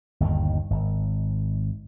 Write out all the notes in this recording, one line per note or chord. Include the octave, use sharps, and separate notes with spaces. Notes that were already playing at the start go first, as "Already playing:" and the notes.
G1 D#2 A#2 D#3
G#1